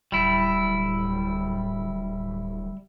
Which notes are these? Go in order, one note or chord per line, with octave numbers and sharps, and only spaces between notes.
D1 G3 E4